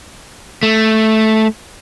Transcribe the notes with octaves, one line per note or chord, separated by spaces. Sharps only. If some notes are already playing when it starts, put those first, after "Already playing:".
A3